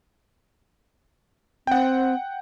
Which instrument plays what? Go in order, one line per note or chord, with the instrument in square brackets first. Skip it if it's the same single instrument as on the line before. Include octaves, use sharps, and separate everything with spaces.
[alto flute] C4 [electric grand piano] F#5 G5